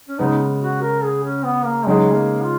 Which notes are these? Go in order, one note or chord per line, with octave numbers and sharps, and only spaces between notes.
C#4
C#3 G#3 B3 D#4
F#4
A#4
G#4
C#4
B3
A#3
C#3 F#3 G#3 D#4 G#4
A#3
F4